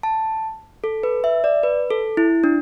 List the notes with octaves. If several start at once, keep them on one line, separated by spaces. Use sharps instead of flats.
A5
A4
B4
E5
D5
B4
A4
E4
D4